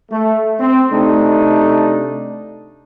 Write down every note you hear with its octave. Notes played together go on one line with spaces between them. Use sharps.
A3
C4
C3 A3 D4 D#4